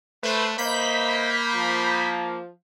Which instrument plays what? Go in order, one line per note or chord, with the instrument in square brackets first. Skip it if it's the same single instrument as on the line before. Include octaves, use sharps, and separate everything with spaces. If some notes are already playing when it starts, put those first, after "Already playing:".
[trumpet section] A3 [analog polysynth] B4 C5 B5
[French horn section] E3 C5 D#5 [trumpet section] A#3 [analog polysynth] B5 G6 B6
[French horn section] F3